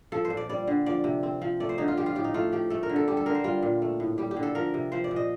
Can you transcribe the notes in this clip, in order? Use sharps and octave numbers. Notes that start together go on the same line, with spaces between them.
F3 A4
C5
A#2
D5
G3 D5
D3
F3 D5
C3
C4
F3
A3 D5
C5
D3 D#4
F4
F3 G4
F4
A2 G4
D#4
A3 F4
F3 G4
A3 A4
A#4
D3
A4
G3 G4
A4
D3 A#4
C5
G3 F4
A#2
A3
A2
G3 G4
G4
D3
A4
F3 A#4
C3
F3 C5
D5
A#2
D#5